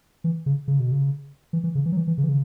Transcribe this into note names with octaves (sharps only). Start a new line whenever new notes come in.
E3
C#3
C#3
B2
C#3
E3
E3
C#3
E3
F#3
E3
E3
C#3
E3
C#3